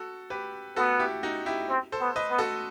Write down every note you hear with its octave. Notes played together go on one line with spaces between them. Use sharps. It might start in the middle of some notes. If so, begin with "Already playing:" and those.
Already playing: F#4 A4
G4 B4
B3 F#4 A4
E4 G4
D#4 F#4
E4 G4
C4
A4 C5
B3
B4 D#5
B3
F#4 A4